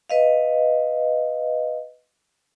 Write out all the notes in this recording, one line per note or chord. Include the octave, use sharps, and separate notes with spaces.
B4 D#5 F5